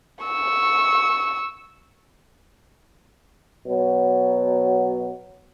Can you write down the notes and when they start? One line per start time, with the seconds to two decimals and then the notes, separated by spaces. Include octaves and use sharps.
0.25 C#6 E6
3.67 B2 F#3